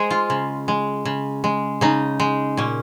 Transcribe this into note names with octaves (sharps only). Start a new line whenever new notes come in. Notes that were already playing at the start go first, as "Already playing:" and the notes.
Already playing: G#3 G#4 C5
F4
C#3
G#3
C#3
G#3
C#3 D#4
G#3
A#2 C#4